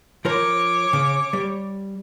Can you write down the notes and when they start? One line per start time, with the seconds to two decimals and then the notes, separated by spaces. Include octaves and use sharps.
0.25 F3 A#4 C5 C#5 D6
0.93 C#3
1.33 G3